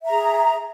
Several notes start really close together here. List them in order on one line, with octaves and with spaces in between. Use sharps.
E5 A#5 G#4